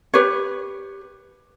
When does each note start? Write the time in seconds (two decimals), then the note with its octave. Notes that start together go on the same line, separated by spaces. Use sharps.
0.14 G4 B4 C#5